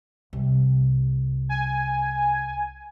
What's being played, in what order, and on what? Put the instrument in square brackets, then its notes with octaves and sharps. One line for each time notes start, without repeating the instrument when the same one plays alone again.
[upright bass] C2
[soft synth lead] G#5